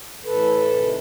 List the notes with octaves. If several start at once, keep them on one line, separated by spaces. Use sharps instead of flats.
A2 E3 A4 B4
C3 D#3